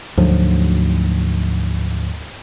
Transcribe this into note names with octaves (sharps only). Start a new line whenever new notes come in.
D2 G#2 F3 F#3